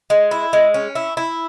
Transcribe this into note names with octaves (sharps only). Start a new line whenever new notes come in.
G#3
E4
G#3
C#4
E4
E4